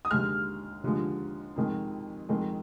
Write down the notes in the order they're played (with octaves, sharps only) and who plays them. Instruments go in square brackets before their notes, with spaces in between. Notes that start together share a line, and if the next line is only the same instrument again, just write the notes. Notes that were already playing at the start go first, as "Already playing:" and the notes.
[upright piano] D#6
D#2 D3 G#3 F6
D#2 D3 F3 G#3
F2 D#3 G#3
F2 D#3 G#3